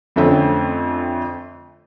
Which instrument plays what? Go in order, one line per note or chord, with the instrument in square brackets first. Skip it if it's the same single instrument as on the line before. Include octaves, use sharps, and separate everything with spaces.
[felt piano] F2 D3 A3 C4 C#4